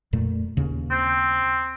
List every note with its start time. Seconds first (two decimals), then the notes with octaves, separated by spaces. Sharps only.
0.13 F2 A#2 A3
0.57 D#2 C#3
0.91 C4